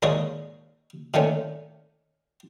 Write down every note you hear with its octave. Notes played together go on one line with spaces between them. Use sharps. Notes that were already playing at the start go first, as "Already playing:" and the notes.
D#2 A#2 G#3 C#5 D#5
A#2 D#3 A3 C#4